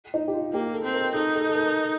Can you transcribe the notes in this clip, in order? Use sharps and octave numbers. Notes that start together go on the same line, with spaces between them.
D#4
G4
F4
A#3 G4
A4
C4
A#4
D#4 A4
A4
A4
A#4